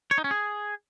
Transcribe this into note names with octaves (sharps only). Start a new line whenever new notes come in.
C#5
D#4
C#4
G#4